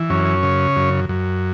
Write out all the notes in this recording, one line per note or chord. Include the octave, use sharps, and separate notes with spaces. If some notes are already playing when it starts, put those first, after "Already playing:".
Already playing: E3
F#2 C#4
C#3
F#2
F#2